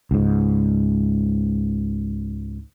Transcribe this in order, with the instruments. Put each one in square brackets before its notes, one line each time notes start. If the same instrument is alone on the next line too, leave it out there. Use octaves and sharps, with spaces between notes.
[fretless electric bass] C#2 G#2